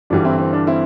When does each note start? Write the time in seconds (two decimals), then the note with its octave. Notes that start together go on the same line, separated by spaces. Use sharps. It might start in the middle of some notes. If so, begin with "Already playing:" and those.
0.10 G1 G2 E3 G3 D4 F#4
0.24 C4 E4
0.39 C4
0.53 D4
0.67 C4 E4